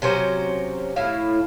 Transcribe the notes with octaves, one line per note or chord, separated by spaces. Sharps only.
C3 F#3 C#4 C5
A2 E4 F5